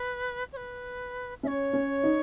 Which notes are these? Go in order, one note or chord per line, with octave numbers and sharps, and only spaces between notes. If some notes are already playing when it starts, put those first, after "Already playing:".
Already playing: B4
C#5
B4
C#4 C#5 E5
C#4
D#4